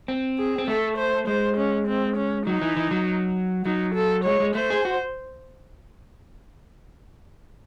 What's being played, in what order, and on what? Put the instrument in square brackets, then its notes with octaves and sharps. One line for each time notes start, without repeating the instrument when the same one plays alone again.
[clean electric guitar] C4
[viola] G#4
[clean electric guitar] C4
[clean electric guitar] A3 [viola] A4
[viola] C5
[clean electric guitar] G#3 [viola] C5
[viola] C#4
C4
C#4
[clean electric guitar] F#3 [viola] D#4
[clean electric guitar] E3
E3
F#3
[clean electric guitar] F#3 [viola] D#4
[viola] A4
[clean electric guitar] G#3 [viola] C#5
[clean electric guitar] G#3
[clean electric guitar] A3 [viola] C5
[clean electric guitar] G#4
F#4